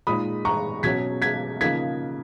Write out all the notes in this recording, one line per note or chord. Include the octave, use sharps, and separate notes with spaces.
A#2 G#3 D#4 B5 D#6
A#5 C#6
B2 F#3 C#4 G#6 B6
G#6 B6
C#3 F3 A#3 D#4 G#6 B6